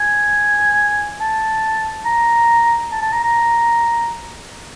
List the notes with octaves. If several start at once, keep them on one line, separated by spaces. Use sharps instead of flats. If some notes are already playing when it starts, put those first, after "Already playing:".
Already playing: G#5
A5
A#5
A5
A5
A#5
A#5